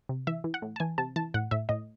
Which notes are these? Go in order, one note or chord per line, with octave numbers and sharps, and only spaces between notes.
C3
E3 E5
E3
F#5
A2
A5
E3 G#5
C3 A5
E3 A5
A2 F#5
A2 E5
A2 D#5